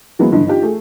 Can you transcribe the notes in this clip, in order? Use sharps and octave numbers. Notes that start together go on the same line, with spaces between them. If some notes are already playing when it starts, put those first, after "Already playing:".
E3 F#3 G#3 A#3 B3 F#4
F#1 G2 D3 E3 D#5
D4 D#4 F4 G4
A3 G#4